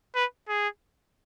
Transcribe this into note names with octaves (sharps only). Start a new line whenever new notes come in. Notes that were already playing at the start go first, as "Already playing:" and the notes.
B4
G#4